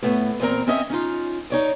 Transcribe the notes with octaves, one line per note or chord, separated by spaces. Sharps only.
A2 A3 B3
E2 A#2 C4 A#4 A#5
C4 C#4 D#5 E5
C#4 D#4 F4
D#4 C#5 D5